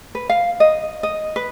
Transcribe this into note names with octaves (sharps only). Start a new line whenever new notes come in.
B4
F5
D#5
D#5
B4